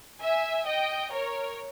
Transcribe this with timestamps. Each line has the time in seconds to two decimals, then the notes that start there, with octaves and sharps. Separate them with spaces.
0.20 E5 G#5
0.66 D#5 G5
1.12 A#4 C#5